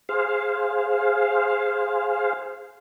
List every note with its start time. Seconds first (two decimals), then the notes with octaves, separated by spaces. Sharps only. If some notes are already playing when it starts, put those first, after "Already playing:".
0.09 G#4 C5 F5